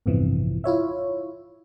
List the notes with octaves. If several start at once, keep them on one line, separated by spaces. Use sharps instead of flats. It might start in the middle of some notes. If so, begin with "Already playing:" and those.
A1 E2 G2 C3 E3 F3
E4 F4 C#5 E5